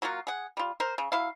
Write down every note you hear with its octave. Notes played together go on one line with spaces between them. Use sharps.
F#3 A#3 F4 F#4
G#4 F#5
G3 F4
A#4 C5
C#3
F#3 E4 F5